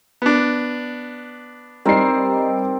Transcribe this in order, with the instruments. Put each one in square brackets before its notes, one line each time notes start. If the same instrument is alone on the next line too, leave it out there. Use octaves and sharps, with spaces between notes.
[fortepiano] B3 D4
[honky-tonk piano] G3 D#4 C7 [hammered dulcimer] C4 A#4 D5